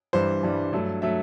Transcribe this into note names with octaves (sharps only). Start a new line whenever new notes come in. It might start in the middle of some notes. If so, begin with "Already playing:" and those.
G2 E3 G3 C5
G2 E3 G3
G2 F#3 A3
F#3 A3 E5